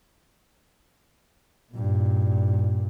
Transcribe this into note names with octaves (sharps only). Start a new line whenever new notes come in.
G2 A#2